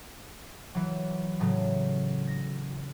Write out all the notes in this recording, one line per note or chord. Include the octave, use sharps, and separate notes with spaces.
E3 F#3
A2 C#3 F#3
A#6